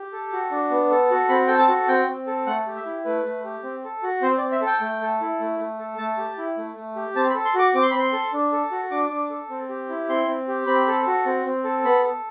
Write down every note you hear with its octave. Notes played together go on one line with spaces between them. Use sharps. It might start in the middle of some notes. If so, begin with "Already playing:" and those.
Already playing: G4
A4
F#4
D4
B3
A4
F#4
C4 B5
A4 G5
A5
F#4
C4 G5
C4
A4
A3 F#5
G4
E5
E4
A3 B4
A3
G4
C4
A4
F#4
C4 C5
D5
C4
E5
A4
G5
A3
A4
E4
A3
A3
A4
A3 A5
G4
E4
A3
A3
G4
C4 A5
B5
A4
C6
F#4 D6
C4 D6
C6
B5
C4 C6
A4
D4
A4
F#4
D4 D6
D4
A4
C4
G4
E4
C4 C6
C4
G4
C4 B5
A4
F#4
C4
C4
A4
B3 B5
A4